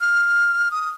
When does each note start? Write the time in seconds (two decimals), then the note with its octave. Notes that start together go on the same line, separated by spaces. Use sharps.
0.01 F6
0.71 D#6